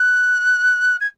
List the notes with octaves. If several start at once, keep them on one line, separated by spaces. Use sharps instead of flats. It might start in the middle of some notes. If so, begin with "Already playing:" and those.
Already playing: F#6
G#6